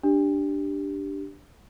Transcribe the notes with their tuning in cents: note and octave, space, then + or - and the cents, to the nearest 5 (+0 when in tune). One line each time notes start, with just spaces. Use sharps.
D4 +0 G4 +0